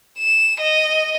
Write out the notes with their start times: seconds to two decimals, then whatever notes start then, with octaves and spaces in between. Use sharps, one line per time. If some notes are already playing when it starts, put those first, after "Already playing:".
0.18 E7
0.60 D#5